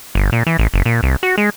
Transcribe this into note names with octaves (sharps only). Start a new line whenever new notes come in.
G1
A#2
E3
A1
F#1
A#2
C2
F#4
G#3